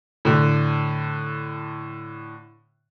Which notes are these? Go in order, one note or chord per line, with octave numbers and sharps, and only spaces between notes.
A2 D3